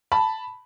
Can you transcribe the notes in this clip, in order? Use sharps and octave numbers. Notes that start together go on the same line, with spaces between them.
A5 B5